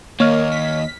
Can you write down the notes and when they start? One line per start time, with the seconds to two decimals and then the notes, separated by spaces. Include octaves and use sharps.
0.20 D#2 A#3 C#5 D#5 F6
0.52 B6